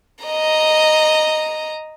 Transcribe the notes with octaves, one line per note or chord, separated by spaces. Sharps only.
D#5 A#5